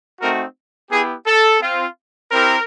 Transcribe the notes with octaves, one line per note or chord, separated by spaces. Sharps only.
A3 C4 D#4 F#4 A#4
B3 E4 G4 G#4
A4
C4 F4
C4 E4 G4 A#4